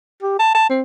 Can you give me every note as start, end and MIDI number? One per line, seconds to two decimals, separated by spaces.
0.22 0.35 67
0.39 0.50 81
0.55 0.66 81
0.70 0.82 60